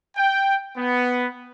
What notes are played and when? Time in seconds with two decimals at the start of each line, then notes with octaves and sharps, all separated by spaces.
0.17 G5
0.76 B3